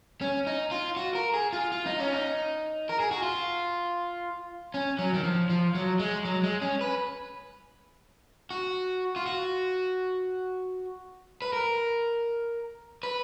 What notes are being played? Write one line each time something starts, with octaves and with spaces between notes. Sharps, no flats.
C#4
D#4
F4
F#4
A#4
G#4
F4
F4
D#4
C#4
D#4
A#4
G#4
F#4
F4
C#4
F#3
D#3
F3
F3
F#3
G#3
F#3
G#3
C#4
B4
F#4
F4
F#4
B4
A#4
B4